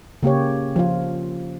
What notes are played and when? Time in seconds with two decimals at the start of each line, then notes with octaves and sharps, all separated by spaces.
0.23 C#3 A#3 G4 C#5
0.76 F3 F4